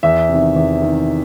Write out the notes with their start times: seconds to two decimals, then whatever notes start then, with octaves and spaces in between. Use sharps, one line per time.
0.03 E2 E5
0.29 C3 D#3
0.56 E2
0.82 C3 D#3